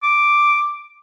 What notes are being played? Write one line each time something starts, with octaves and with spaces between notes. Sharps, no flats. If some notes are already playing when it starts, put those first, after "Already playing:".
D6